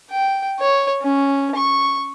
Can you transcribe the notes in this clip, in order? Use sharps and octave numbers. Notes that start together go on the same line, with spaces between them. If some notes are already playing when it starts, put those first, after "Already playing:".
G5
C#5
C#4
C#6